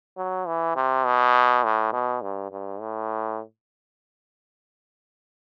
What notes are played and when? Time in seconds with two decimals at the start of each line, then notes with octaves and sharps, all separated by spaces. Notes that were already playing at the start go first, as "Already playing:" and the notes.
0.17 F#3
0.47 E3
0.76 C3
1.06 B2
1.64 A2
1.93 B2
2.22 G2
2.51 G2
2.80 A2